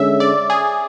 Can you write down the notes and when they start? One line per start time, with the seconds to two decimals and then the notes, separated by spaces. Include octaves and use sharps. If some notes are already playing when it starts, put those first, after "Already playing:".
Already playing: D3 G#3 C#4 E5
0.20 D5
0.50 G#4